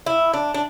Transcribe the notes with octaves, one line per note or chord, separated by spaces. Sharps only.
E4
D4
D4